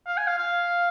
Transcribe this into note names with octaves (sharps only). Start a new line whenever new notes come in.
F5
G#5
F5
F5